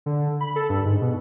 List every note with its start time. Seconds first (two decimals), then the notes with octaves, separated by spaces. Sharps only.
0.06 D3
0.41 B5
0.56 A4
0.70 G2
0.86 G#2
1.01 B2